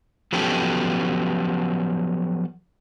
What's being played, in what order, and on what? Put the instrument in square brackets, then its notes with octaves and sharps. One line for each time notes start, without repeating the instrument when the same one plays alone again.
[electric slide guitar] F3 F#3 B3 C#4 G4 A4